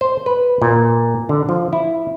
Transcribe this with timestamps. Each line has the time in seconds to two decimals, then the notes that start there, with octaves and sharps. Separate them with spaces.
0.01 C5
0.26 B4
0.62 A#2
1.29 D3
1.49 F3
1.73 E4